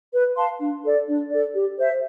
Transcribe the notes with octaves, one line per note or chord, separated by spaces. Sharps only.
B4
F5 A5 C6
D4
A4 D5
D4
A4 D5
G4
C5 E5